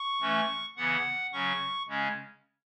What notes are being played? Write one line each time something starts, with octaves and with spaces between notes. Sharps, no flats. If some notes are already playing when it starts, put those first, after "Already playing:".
Already playing: C#6
E3 A3 C#4
C#3 E3 B3 F#5
C#3 F#3 C#4 C#6
C#3 G#3 C#4